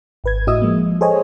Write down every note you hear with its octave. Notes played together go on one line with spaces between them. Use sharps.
G#1 B4 G#6
A2 E4 F#4 D#5 D#6 E6
F3 G#3 A#3
G#4 A4 C5 C#5 D#5 G#5